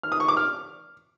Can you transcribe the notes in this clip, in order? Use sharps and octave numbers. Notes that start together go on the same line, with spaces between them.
F6
D#6
C#6
D6
F6